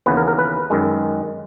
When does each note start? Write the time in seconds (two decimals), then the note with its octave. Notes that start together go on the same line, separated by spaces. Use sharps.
0.06 D#2 C#3 E3 B3 B4
0.17 A#4
0.27 A#4
0.38 B4
0.70 F#2 D#3 G#3